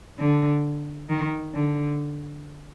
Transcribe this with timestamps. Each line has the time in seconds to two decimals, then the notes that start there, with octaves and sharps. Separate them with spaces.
0.20 D3
1.10 D#3
1.54 D3